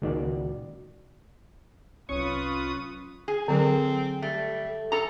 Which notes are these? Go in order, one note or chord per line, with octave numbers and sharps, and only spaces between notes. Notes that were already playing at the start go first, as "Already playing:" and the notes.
C#2 A#2 D#3 F#4 D5
C2 F#3 C#4 F4 B4 C#6 D#6
G#4
D3 F#3 C4 A#4
G3 A3
A4 A#5